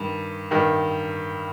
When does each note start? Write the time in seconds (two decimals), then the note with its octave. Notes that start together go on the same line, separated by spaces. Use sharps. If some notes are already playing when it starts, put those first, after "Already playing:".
Already playing: G2 D#3
0.51 G2 D#3